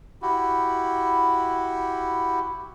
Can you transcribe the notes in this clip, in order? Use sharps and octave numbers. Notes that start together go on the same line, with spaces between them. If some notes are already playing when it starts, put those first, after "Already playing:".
E4 F#4 G4